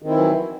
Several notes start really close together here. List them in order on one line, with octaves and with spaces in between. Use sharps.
D#3 C4 E4 E3 F#3